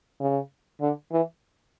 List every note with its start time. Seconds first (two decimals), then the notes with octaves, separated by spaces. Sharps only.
0.20 C#3
0.81 D3
1.11 E3